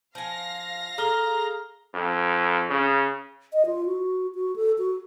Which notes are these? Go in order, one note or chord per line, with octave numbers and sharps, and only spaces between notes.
F3 F5 G#5 A#6
G#4 A4 A#5 F6 G7
F2
C#3
D#5
F4
F#4
F#4
A4
F#4